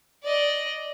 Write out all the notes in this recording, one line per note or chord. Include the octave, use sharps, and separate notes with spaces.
D5 D#5